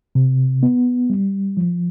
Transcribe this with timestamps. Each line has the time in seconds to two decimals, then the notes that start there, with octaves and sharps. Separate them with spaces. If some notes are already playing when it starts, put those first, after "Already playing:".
0.15 C3
0.63 B3
1.10 G3
1.57 F3